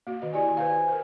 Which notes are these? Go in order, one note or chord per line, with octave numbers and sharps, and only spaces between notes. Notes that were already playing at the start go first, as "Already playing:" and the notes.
A#3 F#4
D#3 D#5
E4 G4 D5 G#5
B4 C5 F5
A#4 C5